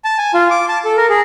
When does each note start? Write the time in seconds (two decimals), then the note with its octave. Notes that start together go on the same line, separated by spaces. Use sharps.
0.05 A5
0.18 G#5
0.34 F4
0.50 D6
0.69 A5
0.85 A4
0.97 A#4
1.10 G#4